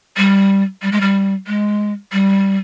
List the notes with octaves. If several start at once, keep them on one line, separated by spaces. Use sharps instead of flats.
G3
G3
G#3
G3
G#3
G3